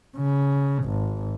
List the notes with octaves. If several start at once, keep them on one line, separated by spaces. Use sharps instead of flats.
C#3
G#1